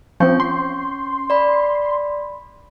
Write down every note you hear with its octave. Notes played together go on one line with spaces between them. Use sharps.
F3 C4 C#4 C#6 G6
C6
D5 B5